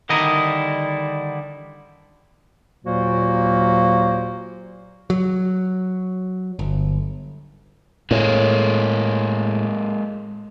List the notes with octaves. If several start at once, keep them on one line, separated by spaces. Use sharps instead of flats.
D3 D#3 G3 E4 D#5 A#5
D#2 A#2 F#3 A#3 F#4 C5
F#3
G1
A2 G#3 A#3